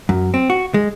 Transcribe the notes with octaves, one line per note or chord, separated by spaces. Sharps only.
F#2
C4
F#4
G#3